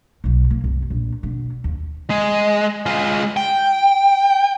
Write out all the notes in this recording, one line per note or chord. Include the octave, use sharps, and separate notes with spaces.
B1 F#3
A#3
C2 F#2
A#1
B2 D3
D#2
G#3
G#3 F4
G5